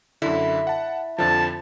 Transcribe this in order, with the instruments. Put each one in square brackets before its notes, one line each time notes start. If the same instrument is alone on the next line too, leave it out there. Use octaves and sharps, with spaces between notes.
[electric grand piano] F#2 D3 [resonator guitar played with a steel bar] E4
[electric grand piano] F#5 A5
[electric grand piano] F2 D3 F3 [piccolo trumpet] A5